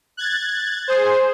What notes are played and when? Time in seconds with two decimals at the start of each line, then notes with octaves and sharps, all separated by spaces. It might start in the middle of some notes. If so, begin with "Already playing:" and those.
0.17 F#6 G#6 A6
0.88 G#4 C5